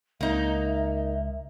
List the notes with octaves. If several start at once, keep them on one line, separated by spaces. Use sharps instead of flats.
C#2 A#3 D#4 E5